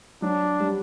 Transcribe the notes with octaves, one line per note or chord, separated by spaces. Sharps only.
F#3 D4
G3